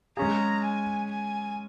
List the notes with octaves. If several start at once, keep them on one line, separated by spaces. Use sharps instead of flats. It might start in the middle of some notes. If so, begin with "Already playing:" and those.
G#3 C#4 G#4 A#5
G#5
G#5